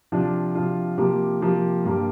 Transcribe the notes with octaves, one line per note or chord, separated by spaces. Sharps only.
C3 F3 D4 F4
C3 F3 D4 F4
C3 F3 A#3 G4
C3 F3 A#3 G4
G2 G3 A#3 G4